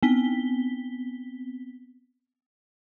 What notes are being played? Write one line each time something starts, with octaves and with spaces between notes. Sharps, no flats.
B3 C4 B6 G7